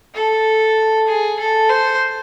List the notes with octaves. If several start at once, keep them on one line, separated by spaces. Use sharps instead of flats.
A4
G#4
A4
C5